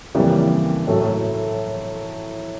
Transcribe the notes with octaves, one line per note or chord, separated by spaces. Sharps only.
F2 C#3 E3 G3 A#3 G4
A2 F#3 A3